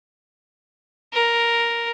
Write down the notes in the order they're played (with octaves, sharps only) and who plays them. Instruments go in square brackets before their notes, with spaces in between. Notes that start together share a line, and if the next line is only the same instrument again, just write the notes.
[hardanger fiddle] A#4